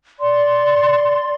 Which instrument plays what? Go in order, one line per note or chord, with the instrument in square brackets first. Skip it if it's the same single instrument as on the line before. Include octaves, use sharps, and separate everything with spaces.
[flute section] D5 C6